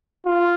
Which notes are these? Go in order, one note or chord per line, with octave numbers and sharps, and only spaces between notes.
F4